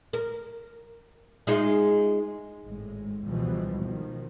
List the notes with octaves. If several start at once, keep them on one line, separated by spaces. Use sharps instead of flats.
A#4
G#3 D#4 F4
G#1 A2 G#3
C#2 B2 E3 F3 G3
B2 D#3 F3